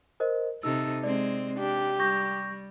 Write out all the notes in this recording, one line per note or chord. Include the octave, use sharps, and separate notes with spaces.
A#4 C5 D#5
C3 D#4 A4 E6
G#3 C4 D5
D4 G4
G3 C#6 G6 A#6